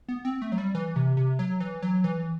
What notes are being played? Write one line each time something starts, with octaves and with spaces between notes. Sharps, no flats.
B3
C4
A3
F#3
G3
E3
C3
C3
F#3
E3
F#3
E3